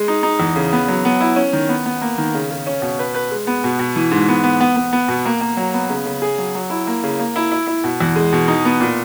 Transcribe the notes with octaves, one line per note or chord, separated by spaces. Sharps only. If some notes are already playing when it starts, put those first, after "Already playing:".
Already playing: G#3
D#4
D#4
E2
C#3
B3
F#3
B3
E4
C#4
D#3
B3
B3
A#3
D#3
C#3
C#3
C#4
B2
B4
B4
G#3
B3
B2
B2
E3
G#2
B3
B3
B3
B3
B3
B2
A#3
A#3
F#3
B3
C#3
C#3
G#4
F#3
F#3
E4
A#3
C#3
A#3
E4
E4
E4
B2
E2
G#3
B2
D#4
B3
A#2